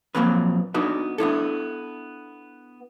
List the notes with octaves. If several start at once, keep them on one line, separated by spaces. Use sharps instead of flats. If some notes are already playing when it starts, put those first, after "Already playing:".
A#2 F3 F#3 A#3 C4 B4
B3 D4 D#4 F#4 B4
B3 D4 E4 A4